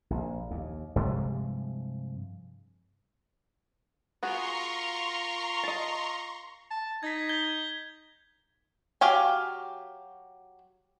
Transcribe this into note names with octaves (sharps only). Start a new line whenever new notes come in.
A#1
D#2
G2 C3 F3 G#3
B3 F4 F#4 G#4 A#4 A#5 C6 C#6
D#5 A5
A5
D#4 G#6 B6
G6 G#6 G7
F#3 G4 F5 G5 G#5